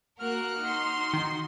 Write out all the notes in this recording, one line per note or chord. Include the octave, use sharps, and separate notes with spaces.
A#3 F#4 A#4 F6 F#6
D#4 F#4 C6
D#3